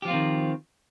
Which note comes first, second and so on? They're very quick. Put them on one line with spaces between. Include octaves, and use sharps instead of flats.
G4 F3 F4 C4 D#3